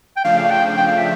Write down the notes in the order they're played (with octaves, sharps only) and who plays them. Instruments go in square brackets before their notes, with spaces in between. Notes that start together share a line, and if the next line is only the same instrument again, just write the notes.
[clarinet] G5
[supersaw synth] C#3 F3 A3 D4 [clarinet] F5
[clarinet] F5
G5
G5
F5
E5